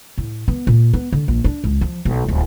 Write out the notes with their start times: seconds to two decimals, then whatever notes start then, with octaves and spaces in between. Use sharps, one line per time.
0.18 A2
0.48 B3
0.67 A#2
0.93 B3
1.12 D3
1.28 A#1
1.44 D4
1.64 C#2
1.81 F3
2.05 B1
2.28 D1